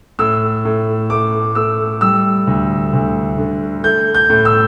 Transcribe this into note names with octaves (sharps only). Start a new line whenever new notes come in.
A2 E6
A2
A3 D6
A3 E6
G3 E6
D2
D2
D3
A3 G6
G6
A2
E6